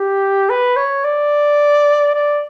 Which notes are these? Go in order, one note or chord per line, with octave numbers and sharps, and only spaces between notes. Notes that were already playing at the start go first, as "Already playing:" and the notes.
Already playing: G4
B4
C#5
D5
D5